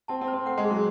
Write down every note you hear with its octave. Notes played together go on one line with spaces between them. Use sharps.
C4 A5
C4
C5
C4
A3 F#5
G#3
G#4
F#3